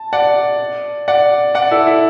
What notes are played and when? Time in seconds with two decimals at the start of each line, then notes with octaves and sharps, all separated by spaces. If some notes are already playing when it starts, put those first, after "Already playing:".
Already playing: A5
0.13 D5 F#5
1.08 D5 F#5
1.55 D5 F#5
1.71 E4 A4
1.87 E4